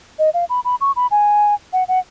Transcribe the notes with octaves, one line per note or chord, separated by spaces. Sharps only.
D#5
F5
B5
B5
C#6
B5
G#5
F#5
F#5